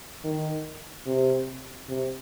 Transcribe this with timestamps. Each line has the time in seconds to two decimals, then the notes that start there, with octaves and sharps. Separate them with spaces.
0.24 D#3
1.06 C3
1.89 C3